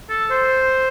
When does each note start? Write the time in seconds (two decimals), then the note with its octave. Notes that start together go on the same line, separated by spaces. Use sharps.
0.09 A4
0.31 C5